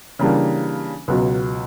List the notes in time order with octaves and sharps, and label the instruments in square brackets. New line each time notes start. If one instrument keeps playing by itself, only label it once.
[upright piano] C#3 E3 G3 A#3 D4
C#2 B2 F#3